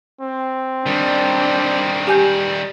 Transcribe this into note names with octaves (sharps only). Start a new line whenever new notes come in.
C4
D#3 G3 D4
G4 G#5 G6